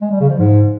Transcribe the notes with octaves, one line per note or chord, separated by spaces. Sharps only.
G#3
G3
C#3
F3
G#2